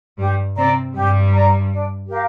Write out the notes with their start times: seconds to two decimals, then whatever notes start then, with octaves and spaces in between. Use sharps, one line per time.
0.18 G2 G3 G4
0.56 C3 C4 D5 A#5
0.94 G2 G3 G4
1.32 D5 A#5
1.71 D4
2.08 G4 A#4 F5